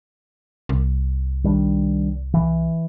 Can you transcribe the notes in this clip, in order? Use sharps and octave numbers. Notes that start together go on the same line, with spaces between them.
C2
D#3 G3 D4
E3